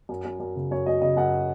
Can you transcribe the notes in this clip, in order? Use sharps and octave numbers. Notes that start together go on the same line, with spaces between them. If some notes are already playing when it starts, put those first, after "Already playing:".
F#2
F#2
F#2
C#3
F#2 C#5
F#3 D#5
C#3 D#5
F#2 F#5